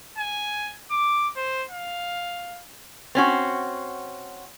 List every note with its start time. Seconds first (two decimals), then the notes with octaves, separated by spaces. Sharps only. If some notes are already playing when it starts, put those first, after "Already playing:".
0.18 G#5
0.91 D6
1.36 C5
1.70 F5
3.15 C4 C#4 F#4